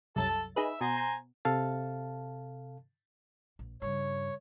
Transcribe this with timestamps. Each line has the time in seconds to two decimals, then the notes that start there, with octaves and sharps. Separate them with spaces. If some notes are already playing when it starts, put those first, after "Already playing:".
0.16 C2 F#2 A4 A5 A6
0.56 D#4 G#4 B4 E5
0.81 B2 C5 G#5 A#5
1.45 C3 A4 F5 A5
3.59 A#1
3.82 G2 C#3 C#5